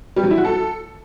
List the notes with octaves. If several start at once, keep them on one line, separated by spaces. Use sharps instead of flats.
G3
F#3
E4
F#4
A4